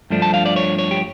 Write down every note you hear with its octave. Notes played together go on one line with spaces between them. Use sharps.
G2 F3 A3 D4
A5
F5
D5
C#5
C#5
G4